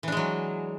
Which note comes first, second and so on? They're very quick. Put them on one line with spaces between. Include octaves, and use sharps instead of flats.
E3 D4 G#3 F#3